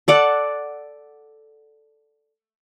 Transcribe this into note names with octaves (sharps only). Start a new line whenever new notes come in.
A4 D5 F#5